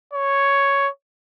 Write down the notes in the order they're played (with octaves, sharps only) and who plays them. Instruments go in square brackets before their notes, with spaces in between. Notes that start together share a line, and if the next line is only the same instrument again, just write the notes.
[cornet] C#5